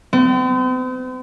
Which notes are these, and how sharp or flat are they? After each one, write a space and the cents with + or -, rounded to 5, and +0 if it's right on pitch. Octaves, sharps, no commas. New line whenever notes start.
C4 -45